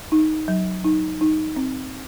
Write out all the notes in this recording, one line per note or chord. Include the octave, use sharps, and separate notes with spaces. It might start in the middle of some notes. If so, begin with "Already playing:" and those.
D#4
F#3
D#4
D#4
C4